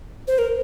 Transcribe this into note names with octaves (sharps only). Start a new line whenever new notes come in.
C5
A#4